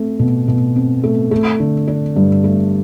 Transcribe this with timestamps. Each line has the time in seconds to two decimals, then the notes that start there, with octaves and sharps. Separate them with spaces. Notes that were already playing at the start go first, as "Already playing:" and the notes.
Already playing: A3 C4
0.19 B2
0.48 B2
0.76 C4
1.04 A3
1.31 A3
1.60 D3
1.88 D4
2.16 G2
2.44 A3